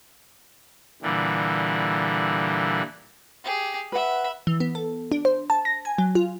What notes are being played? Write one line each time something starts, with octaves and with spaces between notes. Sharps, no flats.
A#2 D3 E3 G3
G4 G#4
B4 E5 F#5 B5
E3
B3
A4
D4
C5
A5
A#6
G#5
F#3
F4